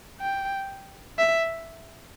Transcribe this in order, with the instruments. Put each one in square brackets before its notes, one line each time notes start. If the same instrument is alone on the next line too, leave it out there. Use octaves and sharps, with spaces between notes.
[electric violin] G5
E5